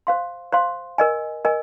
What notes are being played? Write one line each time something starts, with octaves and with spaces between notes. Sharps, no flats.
C5 F5 C6
C5 F5 C6
A#4 D#5 G#5
A#4 D#5 G#5